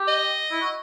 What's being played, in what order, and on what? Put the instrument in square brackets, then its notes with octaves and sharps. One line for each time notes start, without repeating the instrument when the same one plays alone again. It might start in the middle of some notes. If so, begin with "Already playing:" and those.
Already playing: [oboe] G4
[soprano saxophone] D#5
[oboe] E4
F#4